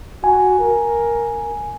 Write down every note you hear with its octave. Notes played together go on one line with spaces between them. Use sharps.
F#4 G#5
A#4